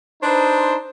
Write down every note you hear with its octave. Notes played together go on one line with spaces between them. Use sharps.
D4 D#4 B4 C5